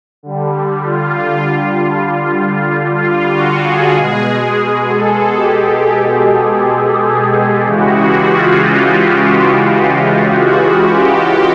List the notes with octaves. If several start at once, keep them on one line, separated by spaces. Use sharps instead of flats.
D3 G3
F4
F4
F#4
G#4
B2 G#3
A4
G4
C#3 E3 G#3 F#4
F#4
F4
F#4
G4
F#4
F4
F#4
F#4
G4